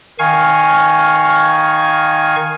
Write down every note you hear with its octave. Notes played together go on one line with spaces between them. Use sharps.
D#3 F5 G#5 C#6